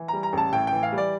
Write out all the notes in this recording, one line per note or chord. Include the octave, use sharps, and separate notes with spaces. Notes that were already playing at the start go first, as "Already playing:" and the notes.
Already playing: E3
G3 A#5
A#5
A1 A5
A2 G5
G5
E3
F5
G3
D5